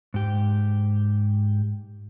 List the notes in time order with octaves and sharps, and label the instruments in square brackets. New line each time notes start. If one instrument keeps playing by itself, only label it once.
[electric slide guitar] G#2 G4